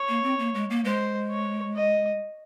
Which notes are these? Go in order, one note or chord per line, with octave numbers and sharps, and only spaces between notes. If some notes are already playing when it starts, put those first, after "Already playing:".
Already playing: C#5
A#3
C4
A#3
G#3
A#3
G#3 C5
C#5
D#5